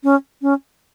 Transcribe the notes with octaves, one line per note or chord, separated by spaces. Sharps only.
C#4
C#4